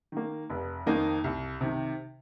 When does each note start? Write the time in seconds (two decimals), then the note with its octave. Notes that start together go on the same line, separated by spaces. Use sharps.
0.12 D#3 A#3
0.50 F1
0.86 F2 D#3 A#3 D#4
1.24 C2
1.61 C3 D#3